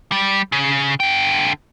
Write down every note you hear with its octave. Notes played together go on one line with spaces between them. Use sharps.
G3
C#3
D3 G5